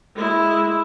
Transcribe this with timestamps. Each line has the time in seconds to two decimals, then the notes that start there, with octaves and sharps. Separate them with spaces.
0.16 G#3 E4